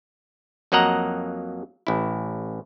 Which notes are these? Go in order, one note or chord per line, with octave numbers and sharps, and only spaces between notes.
F2 F#3 A#3 D#5 F#5 A#5
A1 E4